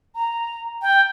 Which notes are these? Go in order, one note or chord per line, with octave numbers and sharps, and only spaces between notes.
A#5
G5